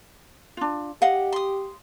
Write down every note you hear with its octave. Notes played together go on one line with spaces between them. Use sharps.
D4 F4
G4 D#5 F5 F#5
C6 D#6